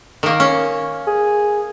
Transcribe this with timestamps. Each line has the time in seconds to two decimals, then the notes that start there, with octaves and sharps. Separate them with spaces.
0.23 D#3 A#3
0.40 C#4
1.07 G#4